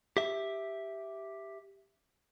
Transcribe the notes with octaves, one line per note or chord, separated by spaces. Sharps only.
G4 E5